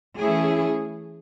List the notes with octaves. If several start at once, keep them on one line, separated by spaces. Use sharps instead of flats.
E3 A3 C#4 E4 G#4